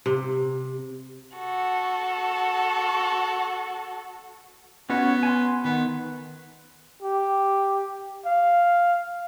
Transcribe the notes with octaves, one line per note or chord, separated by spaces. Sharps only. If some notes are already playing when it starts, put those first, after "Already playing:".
C3
F#4 A4
B3 C#4 F#4 C#5
G#5 C6
D#3 B3
G4
F5